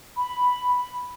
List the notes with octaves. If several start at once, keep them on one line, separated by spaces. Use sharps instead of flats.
B5